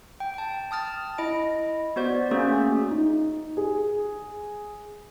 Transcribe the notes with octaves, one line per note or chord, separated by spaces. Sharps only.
G5
G5 A5
A5 D#6 F6 A6
E4 D#5 D7
B3 F#4 C5 D5
A3 A#3 C#4 F#4 G#4
D#4
G#4